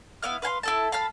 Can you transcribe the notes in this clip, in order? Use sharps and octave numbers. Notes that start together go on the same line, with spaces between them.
B3 E4 F5 F6
B4 F5 G#5 C6
E4 A4 A5
F5 A5 B5 F6